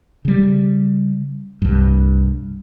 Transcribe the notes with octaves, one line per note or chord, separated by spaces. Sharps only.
C#3 G3
C2 G2